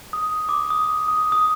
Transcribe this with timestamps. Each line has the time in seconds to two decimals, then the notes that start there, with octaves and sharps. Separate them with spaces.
0.13 D#6
0.49 D6
0.70 D#6
1.08 D#6
1.32 D#6